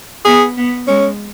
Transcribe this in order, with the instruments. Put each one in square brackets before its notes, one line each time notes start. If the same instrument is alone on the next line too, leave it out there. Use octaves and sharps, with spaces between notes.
[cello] B3 [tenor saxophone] G#4
[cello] B3
[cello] G#3 [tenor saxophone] C#4